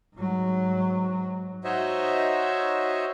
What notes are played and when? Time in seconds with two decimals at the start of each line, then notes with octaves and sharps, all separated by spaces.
0.15 G#2 F#3
1.64 D#4 F#4 C5 C#5 D#5 E5